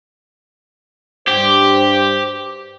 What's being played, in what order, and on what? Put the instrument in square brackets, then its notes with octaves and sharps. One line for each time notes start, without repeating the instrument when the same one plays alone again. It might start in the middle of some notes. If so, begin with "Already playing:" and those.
[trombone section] G2 C5 [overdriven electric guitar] G4